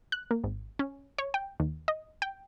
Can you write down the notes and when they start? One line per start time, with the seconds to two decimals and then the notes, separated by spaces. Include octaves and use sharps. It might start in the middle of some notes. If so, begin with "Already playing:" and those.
0.12 F#6
0.31 A#3
0.44 G#1
0.79 C#4
1.18 C#5
1.34 G5
1.60 D#2
1.88 D#5
2.22 G5